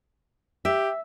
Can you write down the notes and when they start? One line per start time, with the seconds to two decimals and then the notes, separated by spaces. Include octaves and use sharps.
0.65 G4 E5